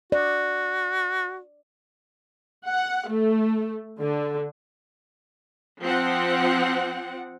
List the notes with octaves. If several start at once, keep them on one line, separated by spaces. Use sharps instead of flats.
F#4 D5
F#5
A3
D3
F3 C4 F#5